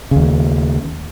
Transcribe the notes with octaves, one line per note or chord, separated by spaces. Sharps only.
D#2 C#3